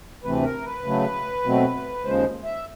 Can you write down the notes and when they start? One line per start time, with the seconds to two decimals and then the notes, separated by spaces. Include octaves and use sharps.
0.24 D2 C3 E3 A3 C4 B4
0.44 A#4
0.64 B4
0.84 C#3 F#3 A3
1.44 B2 F#3 A3 C4
2.04 D#2 C#3 F3 G#3 C5
2.44 E5